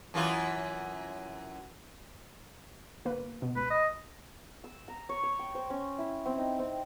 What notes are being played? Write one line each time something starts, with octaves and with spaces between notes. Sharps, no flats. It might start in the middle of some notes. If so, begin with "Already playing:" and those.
F#2 E3 F4
G1 A#3 B4
B2
C#2 B4
D#5
E6
A#5
C#5
C#5
G5
C5
C#4
E4
C4
D#4
C4